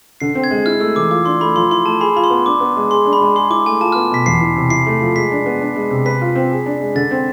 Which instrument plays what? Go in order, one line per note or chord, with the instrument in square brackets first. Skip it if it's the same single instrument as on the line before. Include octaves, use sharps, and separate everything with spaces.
[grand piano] D3 [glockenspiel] C7
[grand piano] C4
[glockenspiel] G#6
[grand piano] G#3
[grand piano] E4 [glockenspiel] F6
[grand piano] A3 [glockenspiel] E6
[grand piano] E3 [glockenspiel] D6
[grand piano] F4 [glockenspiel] D6
[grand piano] D4 [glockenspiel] C6
[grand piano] A3 [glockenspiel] B5
[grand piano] F3 [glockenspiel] C6
[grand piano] E4 [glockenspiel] C6
[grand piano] A3 [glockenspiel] A5
[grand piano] G#4 [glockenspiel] B5
[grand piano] F4 [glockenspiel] B5
[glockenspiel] C6
[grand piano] B3
[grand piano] D4 [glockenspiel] D6
[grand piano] B3
G#3
[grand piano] G#4 [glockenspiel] C6
[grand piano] D4
[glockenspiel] B5
[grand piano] G#3
[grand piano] G#4 [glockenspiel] C6
[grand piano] E4 [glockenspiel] D6
[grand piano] A3 [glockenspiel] G#5
[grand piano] F4 [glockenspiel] A5
[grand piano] B3 [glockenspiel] F6
[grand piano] B2 [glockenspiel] B6
[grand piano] E2 [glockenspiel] C7
[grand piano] E3
C3
[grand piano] E4 [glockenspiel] C7
[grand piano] A3
F3
[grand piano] G#3 [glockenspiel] B6
[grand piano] D4
B3
D4
G#3
C3
[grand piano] B4 [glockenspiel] B6
[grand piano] F4
C4
G#4
D4
G#3
[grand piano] D3 [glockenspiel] A6
[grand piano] C4